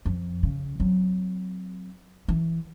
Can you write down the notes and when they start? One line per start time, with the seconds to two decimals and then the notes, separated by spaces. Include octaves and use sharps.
0.05 F2
0.43 C#3
0.80 F#3 C4
2.28 E3